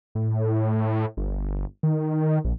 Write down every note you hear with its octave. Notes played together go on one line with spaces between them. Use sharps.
A2
G1
D#3
A#1